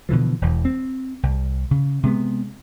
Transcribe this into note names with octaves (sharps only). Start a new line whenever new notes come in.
B2 D3 E3 F3
E1 E2
C4
C2
C#3
C3 G#3 B3